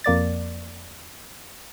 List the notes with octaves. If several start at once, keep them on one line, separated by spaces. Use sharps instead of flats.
F2 A#3 D5 A6